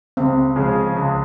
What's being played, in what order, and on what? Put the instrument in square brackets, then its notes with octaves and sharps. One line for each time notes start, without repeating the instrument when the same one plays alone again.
[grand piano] C#2 [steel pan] C4
[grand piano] C#3 F3 G#3
C#2